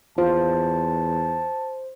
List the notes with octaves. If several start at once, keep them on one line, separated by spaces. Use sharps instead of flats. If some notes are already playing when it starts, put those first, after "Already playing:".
E2 F4 C5 A5